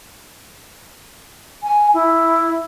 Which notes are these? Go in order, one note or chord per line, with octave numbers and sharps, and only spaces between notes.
G#5
E4